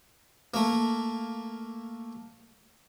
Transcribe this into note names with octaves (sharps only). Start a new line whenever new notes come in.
A3 A#3